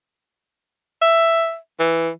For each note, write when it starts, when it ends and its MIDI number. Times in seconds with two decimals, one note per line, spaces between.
1.02 1.57 76
1.80 2.10 52